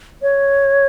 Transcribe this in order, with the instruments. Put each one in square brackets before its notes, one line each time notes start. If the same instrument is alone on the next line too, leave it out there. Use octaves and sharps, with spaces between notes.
[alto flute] C#5